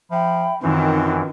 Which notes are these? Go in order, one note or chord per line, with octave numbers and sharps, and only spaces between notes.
F3 E5 G5 B5
F#2 D#3 E3 C4 F4